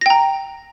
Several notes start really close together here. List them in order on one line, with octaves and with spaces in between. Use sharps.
A#6 G5 A#5